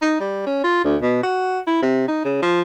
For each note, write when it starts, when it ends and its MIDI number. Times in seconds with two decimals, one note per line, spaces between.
0.02 0.16 63
0.20 0.44 55
0.47 0.63 61
0.64 0.84 65
0.84 0.96 38
1.02 1.21 47
1.23 1.60 66
1.67 1.80 64
1.82 2.05 48
2.08 2.21 63
2.25 2.38 49
2.42 2.62 53